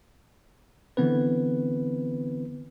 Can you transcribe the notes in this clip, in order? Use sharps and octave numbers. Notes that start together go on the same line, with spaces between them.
D3 E3 B3 C4 B4